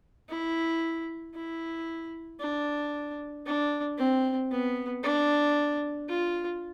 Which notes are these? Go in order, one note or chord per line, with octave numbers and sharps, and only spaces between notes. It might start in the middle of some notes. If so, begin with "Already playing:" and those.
E4
E4
D4
D4
C4
B3
D4
F4